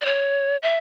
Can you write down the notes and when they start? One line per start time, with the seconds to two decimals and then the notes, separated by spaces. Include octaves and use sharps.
0.02 D5
0.05 C#5
0.63 E5